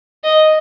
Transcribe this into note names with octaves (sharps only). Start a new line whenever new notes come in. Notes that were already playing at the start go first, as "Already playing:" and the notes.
D#5